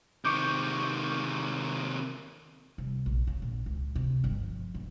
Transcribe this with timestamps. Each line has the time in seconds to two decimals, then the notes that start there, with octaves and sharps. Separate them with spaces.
0.25 C3 D#3 C#6 D6 G6
2.78 C2
3.06 A#1
3.27 C#3
3.42 A#1
3.66 C#2
3.95 C3
4.24 G1
4.41 F3
4.75 G1